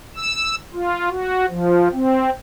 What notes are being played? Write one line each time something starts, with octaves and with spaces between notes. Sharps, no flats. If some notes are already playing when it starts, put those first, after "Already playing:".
E6
F4
F#4
F3
C4